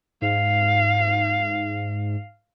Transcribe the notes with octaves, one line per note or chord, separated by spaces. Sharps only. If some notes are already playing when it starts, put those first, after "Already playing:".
G#2 F5